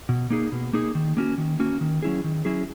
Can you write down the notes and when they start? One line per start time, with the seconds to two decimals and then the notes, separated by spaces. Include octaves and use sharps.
0.09 B2
0.30 A#3 D#4 G#4
0.52 B2
0.73 A#3 D#4 G#4
0.95 D#3
1.17 A#3 C#4 F#4
1.38 D#3
1.60 A#3 C#4 F#4
1.81 D#3
2.02 F#3 C#4 E4 G#4
2.24 D#3
2.45 F#3 C#4 E4 G#4